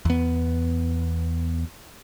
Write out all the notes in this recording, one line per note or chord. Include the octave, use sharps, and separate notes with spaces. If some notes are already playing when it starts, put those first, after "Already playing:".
E2 B3